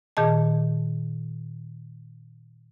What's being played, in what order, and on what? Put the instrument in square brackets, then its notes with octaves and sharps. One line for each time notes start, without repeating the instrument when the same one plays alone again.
[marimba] A#2 D#3 G#4 D#5 A5